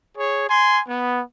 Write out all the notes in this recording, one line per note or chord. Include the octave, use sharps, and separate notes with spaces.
G#4 C#5
G#5 C6
B3